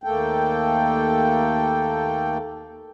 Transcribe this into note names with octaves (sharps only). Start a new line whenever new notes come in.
D#2 A3 A#3 A4 G5